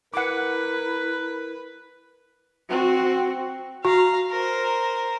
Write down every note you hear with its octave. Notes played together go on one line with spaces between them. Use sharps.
E4 A#4 B4 F#5 D6
C4 F#4
F#4 F5 A#5
A#4 C5